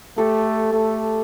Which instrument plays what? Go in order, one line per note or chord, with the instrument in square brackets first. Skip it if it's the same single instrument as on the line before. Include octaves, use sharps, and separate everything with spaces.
[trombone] A3 [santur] G4 A4
[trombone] A3